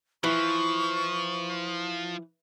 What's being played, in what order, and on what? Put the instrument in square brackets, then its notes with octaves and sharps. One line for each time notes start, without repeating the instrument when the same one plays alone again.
[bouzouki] E3 [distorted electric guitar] F3 [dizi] C#6